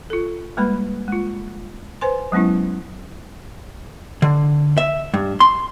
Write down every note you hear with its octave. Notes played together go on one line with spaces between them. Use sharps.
F4 A4
G3 G#3 A#3 B4 B5
G#3 F4
B4 C5 G#5 C6
F#3 G#3 B3 C#4 E4
D3
E5
G2
C6